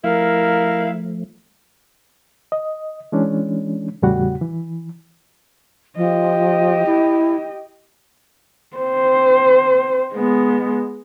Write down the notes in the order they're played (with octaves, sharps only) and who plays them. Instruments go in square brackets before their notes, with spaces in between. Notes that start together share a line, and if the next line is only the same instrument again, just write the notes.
[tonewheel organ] F3 A3 [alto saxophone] E4 [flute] A#4 [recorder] F5
[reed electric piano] D#5
E3 G#3 C#4 D4
E2 A2 C#3 G3 F#4 F#5
E3
[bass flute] F3 [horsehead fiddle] G4 D#5
[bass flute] E4
[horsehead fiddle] C4 C5
G#3 B3